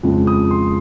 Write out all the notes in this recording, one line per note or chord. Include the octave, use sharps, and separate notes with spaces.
F2 C#3 F3 G#3
D#6
C6